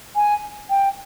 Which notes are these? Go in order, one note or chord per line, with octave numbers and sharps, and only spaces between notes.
G#5
G5